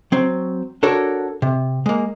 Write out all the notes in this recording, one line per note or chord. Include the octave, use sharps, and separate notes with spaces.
F#3 C4
D4 F#4 A4 A#4 C#5
C3
G#3 A#3